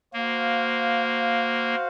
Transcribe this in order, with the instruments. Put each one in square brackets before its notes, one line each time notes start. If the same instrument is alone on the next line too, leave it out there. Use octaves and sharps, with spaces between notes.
[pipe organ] A#3 [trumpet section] F#4 C5 F5